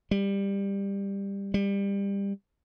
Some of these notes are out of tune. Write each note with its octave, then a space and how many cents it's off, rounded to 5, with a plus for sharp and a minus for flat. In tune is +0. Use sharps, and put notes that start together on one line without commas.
G3 +15
G3 +25